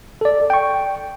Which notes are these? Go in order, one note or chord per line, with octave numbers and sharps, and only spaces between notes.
A4 D5
G5 C#6